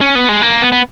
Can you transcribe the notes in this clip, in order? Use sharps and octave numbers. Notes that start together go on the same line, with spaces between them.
C#4
B3
G#3
A#3
B3
B3